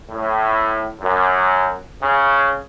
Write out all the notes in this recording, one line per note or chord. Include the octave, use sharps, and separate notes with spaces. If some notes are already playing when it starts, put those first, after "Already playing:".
A2
F#2
C#3